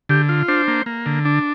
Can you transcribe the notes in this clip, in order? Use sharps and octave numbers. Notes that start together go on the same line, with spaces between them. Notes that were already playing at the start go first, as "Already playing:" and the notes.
D3 G4
F4
D4 C5
A#3
A#3
D3
D4